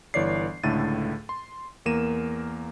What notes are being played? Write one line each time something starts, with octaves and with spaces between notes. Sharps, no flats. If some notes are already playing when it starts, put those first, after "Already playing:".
G1 E3 C#5 D5 C7
C#2 A2 D3 A3 A6 D#7
C6
E2 A#3 A#4 D#7 E7